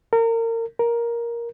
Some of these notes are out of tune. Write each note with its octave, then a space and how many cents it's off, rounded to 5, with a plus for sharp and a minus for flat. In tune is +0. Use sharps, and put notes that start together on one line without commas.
A#4 -30
A#4 +10